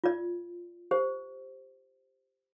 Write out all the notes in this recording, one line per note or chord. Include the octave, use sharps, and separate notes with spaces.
F4 D5
G4 C5